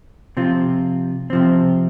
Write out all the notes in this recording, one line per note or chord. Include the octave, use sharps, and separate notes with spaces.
C3 F3 C4 F4
C3 F3 C4